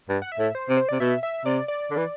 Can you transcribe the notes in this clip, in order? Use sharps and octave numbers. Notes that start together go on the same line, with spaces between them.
G2
F#5
E5
A2
C5
C3
C5
C3 D5
B2 E5
E5
C3 D5
D5
D3
E3